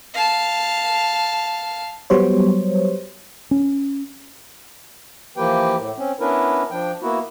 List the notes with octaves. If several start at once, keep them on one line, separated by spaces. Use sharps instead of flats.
F5 A5
F#3 G3 B3 C5 C#5
C#4
E3 F3 A#3 G4 B4 G5
A2
C4 C#4
B3 C#4 D4 E4 A#4 B4
F3 D4 G5
A#3 B3 E4 F#4